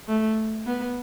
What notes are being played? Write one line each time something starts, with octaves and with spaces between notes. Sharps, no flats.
A3
B3